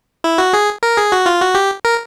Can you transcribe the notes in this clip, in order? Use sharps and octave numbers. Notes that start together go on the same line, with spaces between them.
E4
F#4
G#4
A#4
G#4
F#4
F4
F#4
G4
A#4